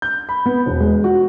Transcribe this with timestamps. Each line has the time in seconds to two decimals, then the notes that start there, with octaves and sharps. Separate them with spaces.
0.02 G6
0.29 B5
0.46 B3
0.66 E1
0.80 G#3
1.04 F#4